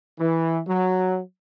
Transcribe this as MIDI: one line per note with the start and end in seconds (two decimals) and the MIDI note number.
0.19 0.60 52
0.67 1.19 54